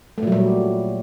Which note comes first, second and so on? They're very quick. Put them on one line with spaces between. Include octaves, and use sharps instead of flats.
A3 A#2 F#3 G3